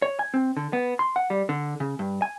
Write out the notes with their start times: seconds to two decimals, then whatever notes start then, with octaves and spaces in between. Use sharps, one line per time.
0.02 C#5
0.19 G#5
0.34 C4
0.57 D3
0.73 B3
0.99 C6
1.16 F#5
1.30 G3
1.49 D3
1.80 C#3
1.99 G2
2.22 G#5